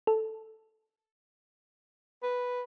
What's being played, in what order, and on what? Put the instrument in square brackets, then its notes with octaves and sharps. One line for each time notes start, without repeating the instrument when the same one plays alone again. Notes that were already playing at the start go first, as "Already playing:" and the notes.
[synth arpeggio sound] A4
[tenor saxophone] B4